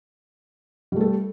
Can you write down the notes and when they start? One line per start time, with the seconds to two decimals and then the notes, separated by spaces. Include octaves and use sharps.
0.92 G3
0.96 A3
1.01 A4